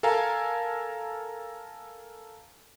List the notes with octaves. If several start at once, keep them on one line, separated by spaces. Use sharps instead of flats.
A4 A#4 F5 G#5 A#5